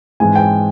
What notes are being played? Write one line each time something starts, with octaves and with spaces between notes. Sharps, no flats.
G#2 E3 G#3 C4 G#5
G5